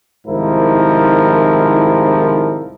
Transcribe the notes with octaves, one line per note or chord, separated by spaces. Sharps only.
C2 G#2 D#3 F3 E4 A#4